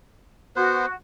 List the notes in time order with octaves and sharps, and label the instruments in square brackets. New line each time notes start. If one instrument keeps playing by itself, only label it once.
[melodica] B3 B4 C5 [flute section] F#4